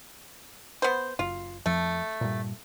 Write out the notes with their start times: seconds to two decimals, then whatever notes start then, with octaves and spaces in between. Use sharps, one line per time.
0.82 B3 C5
1.19 F#1 F4
1.66 F2 F3 A3
2.21 G2 A#2